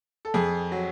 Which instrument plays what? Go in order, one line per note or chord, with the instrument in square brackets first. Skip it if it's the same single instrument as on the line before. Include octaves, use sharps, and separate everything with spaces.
[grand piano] A4
F2 G#4
F#3